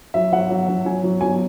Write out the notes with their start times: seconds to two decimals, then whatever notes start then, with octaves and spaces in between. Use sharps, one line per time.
0.14 F#3 E5
0.32 F#3 F#5
0.50 F#3
0.68 F#3
0.85 F#3 G#5
1.04 F#3
1.21 F#3 G#5